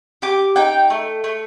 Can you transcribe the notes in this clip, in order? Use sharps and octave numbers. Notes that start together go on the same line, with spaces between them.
G4 D6
D#4 G5
A3
A3